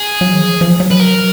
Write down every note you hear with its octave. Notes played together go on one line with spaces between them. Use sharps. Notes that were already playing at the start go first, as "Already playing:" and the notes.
Already playing: G#4
F#3
D#3
F3
F3
F#3
B4
A#4